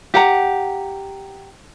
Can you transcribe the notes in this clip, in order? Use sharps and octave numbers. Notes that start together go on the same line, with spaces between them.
G4 F#5 A#5